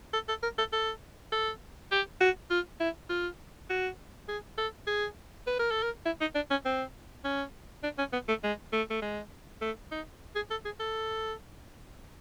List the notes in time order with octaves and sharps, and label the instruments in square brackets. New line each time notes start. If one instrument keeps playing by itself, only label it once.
[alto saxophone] A4
A4
A#4
A4
A4
A4
G4
F#4
F4
E4
F4
F#4
G#4
A4
G#4
B4
A#4
A4
A#4
E4
D#4
D4
C#4
C4
C#4
D4
C#4
B3
A3
G#3
A3
A3
G#3
A3
D#4
G#4
A4
G#4
A4